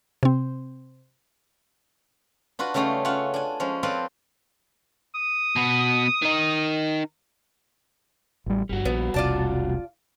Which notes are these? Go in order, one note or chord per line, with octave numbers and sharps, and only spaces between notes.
C3 C4
D4 F4 F#4 B4
C#3 G3 A3 C#4 D#4 G#4
C#4 F4 E5 F#5
D4 G#5
F3 G#3 C#4
C4 F4 A4 B4 D5 F5
D#6
B2 B3
D#3 D#4
A1 G3
G1 G2 G3 F#4
A#1 B3
E1 B1 C3 F4 D5 A5